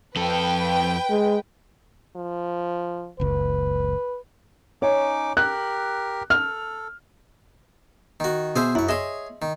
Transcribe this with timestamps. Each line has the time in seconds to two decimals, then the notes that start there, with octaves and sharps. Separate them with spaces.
0.16 F2 A4 B4 G5
1.10 G#3
2.16 F3
3.20 F#1 C#2 B4
4.82 C#4 D#4 C#5 D6
5.37 G4 A#4 F#6
6.30 A4 F6
8.20 D#3 F#4
8.56 B2 G#4 C5 E5
8.75 F#2 E4 C#6
8.89 G#4 C#5 D#5 E5 C6
9.42 D#3